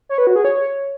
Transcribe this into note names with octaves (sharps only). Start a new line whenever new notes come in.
C#5
B4
F#4
G#4
C#5